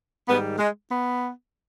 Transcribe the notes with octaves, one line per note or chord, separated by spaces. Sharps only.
G#2 D#3 G3 B3
G#3
B3